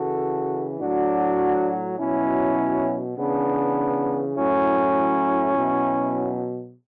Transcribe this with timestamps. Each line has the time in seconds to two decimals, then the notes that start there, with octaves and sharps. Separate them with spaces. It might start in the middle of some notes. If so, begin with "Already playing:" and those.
Already playing: C#3 E3 F#4 A4
0.81 A2 F#3 D4 F#4
1.99 B2 F#3 C#4 E4
3.18 C#3 E3 B3 D4
4.37 A2 F#3 C#4 E4
5.56 B2 F#3